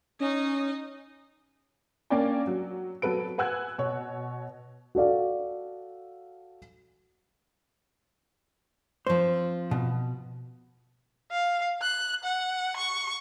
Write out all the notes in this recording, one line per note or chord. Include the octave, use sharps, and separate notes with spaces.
C#4 D#4 D#5
A#3 C#4 D4 D5 G5 G#5
F#3
F#3 B3 A4 B4 D7
B4 F#5 G#5 E6 F#6 G#6
B2 C#5
F#4 A4 D5 F5
F3 C4 C5
B2
F5
F#6
F#5
C#6